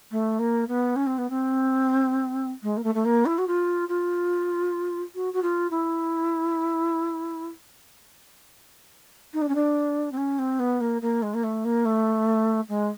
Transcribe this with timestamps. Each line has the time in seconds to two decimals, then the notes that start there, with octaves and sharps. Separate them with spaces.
0.11 A3
0.39 A#3
0.68 B3
0.96 C#4
1.06 C4
1.18 B3
1.30 C4
2.63 G#3
2.77 A#3
2.84 A3
2.94 A3
3.05 A#3
3.25 E4
3.38 F#4
3.47 F4
3.89 F4
5.15 F#4
5.33 F#4
5.42 F4
5.71 E4
9.33 D#4
9.41 D4
9.48 C#4
9.55 D4
10.12 C4
10.17 C#4
10.39 C4
10.59 B3
10.80 A#3
11.02 A#3
11.22 G#3
11.34 A#3
11.43 A3
11.65 A#3
11.85 A3
12.69 G#3